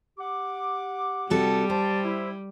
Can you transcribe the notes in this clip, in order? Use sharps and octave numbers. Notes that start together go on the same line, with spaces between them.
G4 F#5 D6
C3 G3 F#4 A4
C5 A5
E4